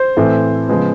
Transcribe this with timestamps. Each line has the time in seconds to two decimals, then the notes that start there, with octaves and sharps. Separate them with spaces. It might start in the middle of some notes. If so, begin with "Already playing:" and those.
Already playing: C5
0.17 A2 E3 A3 C4
0.69 C#3 F3 G#3 B3